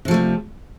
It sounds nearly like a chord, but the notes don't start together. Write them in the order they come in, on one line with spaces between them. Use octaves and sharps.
C3 F3 A3 G3